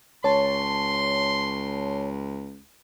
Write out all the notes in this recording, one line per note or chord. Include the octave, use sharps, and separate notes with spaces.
C#2 C#5 A5 C6